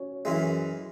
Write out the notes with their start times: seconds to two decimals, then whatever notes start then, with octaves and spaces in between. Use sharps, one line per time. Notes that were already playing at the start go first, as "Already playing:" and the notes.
Already playing: C#4 F#4 C#5
0.25 F#2 E3 G#3